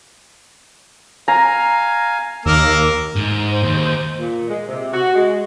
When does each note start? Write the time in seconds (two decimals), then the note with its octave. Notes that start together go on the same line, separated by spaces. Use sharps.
1.28 F5 G#5 A#5
2.46 D#2 A#3 A#4 E6
3.16 G#2
3.49 C5
3.63 D#2
4.19 A#2
4.49 G#3
4.68 C3
4.93 F#4
5.15 G#3